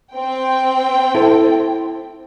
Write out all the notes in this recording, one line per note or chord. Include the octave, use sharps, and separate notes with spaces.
C4 G5
E4 A4